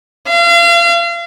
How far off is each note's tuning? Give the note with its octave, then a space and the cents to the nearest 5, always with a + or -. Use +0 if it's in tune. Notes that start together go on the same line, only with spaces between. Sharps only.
F5 -35